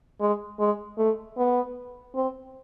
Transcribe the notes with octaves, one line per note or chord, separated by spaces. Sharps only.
G#3
G#3
A3
B3
C4